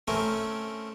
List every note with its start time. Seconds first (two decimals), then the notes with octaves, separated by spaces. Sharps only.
0.08 A3 C4 C#4 A#4